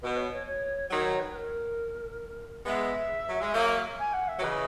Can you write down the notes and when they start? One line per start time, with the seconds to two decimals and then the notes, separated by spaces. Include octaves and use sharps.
0.02 B2 B4
0.16 C#5
0.32 C#5
0.46 C#5
0.90 D#3 F#3 C#5
1.05 C#5
1.19 B4
1.34 A#4
2.66 G#3 B3 E5
3.29 F#3
3.41 G#3
3.54 F#3 A#3
3.98 G#5
4.13 F#5
4.28 E5
4.39 F#3
4.42 C#3 E3 D#5